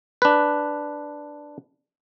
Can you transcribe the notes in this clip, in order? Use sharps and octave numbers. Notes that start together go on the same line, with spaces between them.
D4 B4